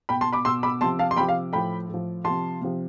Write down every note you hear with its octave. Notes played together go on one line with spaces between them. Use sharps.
B2 G5 B5
A5 C6
B5 D6
B2 C6 E6
B5 D6
C3 F3 A5 C6
F5 A5
C6
C3 F3 G5 B5
F5
A2 F3 G5 B5
A2 F3
F3 A5 C6
C3
C3 F3